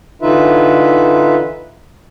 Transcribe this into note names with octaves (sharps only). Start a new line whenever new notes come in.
D3 E3 D#4 F4 B4 E5